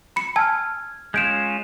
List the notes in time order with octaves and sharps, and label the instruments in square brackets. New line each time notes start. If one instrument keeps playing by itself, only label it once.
[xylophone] B5 C#7
[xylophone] G#5 A5 E6 [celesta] F6 G#6
[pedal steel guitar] G#3 C#4 F4 [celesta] G6 D7 E7